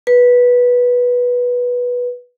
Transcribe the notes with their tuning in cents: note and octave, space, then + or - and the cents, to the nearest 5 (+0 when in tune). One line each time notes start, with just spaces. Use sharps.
B4 -10